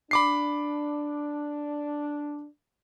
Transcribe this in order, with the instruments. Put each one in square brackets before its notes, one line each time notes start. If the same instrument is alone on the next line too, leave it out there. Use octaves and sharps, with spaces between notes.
[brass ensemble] D4 [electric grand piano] B5 D6 C7